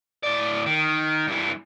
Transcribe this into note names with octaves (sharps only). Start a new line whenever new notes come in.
A2 D5
D#3
G2 E3